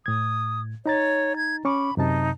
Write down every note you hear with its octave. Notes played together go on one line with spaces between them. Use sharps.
A2 D#6 G#6
D#4 C#5 A#5 A6
G#6
C#4 B5 C#6 D6
F#2 C3 D#4 A5